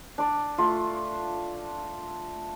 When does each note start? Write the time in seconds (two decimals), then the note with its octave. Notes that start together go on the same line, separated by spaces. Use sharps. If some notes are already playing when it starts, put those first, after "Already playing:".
0.18 D4 D5
0.58 A3 F4